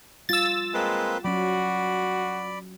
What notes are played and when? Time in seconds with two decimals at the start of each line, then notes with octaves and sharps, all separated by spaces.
0.29 G3 F4 E6 A6
0.74 G#3 A#3 C4 B4
1.25 F#3 C#4 F#4 D5 B5